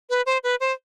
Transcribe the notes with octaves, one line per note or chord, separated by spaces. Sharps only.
B4
C5
B4
C5